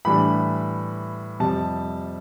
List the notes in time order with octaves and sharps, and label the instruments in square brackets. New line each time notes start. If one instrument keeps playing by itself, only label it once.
[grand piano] A2 E3 G3 D4 B5
F2 C3 G3 A5